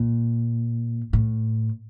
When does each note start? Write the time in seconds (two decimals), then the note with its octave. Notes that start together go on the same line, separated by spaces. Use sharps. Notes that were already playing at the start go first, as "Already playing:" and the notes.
Already playing: A#2
1.13 A2